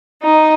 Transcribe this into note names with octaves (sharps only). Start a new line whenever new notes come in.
D#4